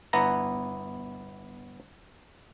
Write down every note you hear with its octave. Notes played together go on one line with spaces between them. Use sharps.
G1 B3 E4 A#5